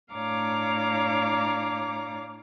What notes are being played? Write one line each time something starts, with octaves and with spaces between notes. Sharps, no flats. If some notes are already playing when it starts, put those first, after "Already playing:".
A2 D4 C#5 F5 A#5 D6